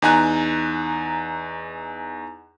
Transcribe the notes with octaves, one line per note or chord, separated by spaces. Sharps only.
E2 D#4 G#5 A#5 F#6